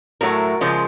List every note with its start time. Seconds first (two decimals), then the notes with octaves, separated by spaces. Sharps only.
0.21 A2 F#3 A3 A#4
0.61 C#3 F3 G#3